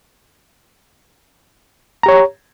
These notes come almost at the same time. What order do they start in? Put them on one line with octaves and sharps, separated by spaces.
A#5 G4 C#5